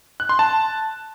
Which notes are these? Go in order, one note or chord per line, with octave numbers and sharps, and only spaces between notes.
F#6
C6
A5